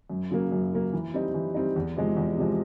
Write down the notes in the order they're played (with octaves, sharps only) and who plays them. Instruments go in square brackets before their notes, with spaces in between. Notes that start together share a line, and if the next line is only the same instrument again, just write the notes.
[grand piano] F#2
C#3 F#3 A#3
F#2
C#3 F#3 A#3
E3
G3 C4 D#4
E3
G3 C4 D#4
E2
C3 F3 G#3
E2
C3 F3 G#3